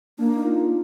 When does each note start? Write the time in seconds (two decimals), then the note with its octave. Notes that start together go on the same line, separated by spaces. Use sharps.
0.18 A#3 D4
0.36 D#4
0.44 F4